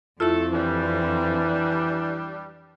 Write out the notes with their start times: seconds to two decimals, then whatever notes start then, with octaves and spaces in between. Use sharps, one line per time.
0.20 F2 A3 C4 E4 F4 A4
0.52 E3 G3 D4